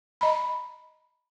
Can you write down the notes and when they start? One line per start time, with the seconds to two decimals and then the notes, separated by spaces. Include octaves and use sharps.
0.21 D#5 A#5 B5